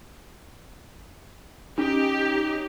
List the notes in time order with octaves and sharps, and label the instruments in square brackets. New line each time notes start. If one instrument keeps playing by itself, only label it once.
[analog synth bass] C#4 [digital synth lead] D#4 [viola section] G4